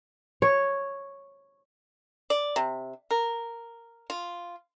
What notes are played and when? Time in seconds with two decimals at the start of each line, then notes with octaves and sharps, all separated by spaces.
0.42 C#5
2.30 D5
2.56 C3
3.11 A#4
4.10 F4